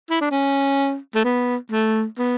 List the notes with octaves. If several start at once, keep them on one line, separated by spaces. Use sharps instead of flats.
E4
D4
C#4
A3
B3
A3
B3